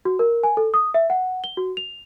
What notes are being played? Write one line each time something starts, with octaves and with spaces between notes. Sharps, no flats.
F#4
A#4
G#5
A4
D#6
E5
F#5
G7
F#4
F7